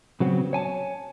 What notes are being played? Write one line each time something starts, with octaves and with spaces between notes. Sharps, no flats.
C#3 F#3 B3 C4
C#5 G#5 A5